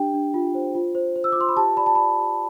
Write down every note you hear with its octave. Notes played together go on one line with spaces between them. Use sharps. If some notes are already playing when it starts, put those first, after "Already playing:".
Already playing: D4 G4 G5
D4
F4
C5
F4
C5
C5
E6
D6
F4 C6
B5
G4 A5
D5 B5
A5
D5 B5
G4